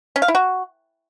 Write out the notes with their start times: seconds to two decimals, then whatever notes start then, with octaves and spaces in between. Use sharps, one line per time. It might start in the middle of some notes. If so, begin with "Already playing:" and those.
0.16 C#4
0.22 F5
0.28 E4
0.35 F#4